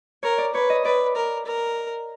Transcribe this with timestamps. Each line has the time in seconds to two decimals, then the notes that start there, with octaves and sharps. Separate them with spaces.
0.23 A#4 C#5
0.38 D5
0.54 B4 C#5
0.70 D#5
0.85 B4 D5
1.16 A#4
1.46 A#4